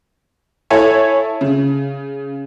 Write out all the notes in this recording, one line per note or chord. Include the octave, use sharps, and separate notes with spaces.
E4 A4 C#5 E5 G#5
C#3